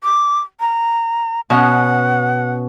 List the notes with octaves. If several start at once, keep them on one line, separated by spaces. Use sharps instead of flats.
D6
A#5
B2 C#4 D#5 F#5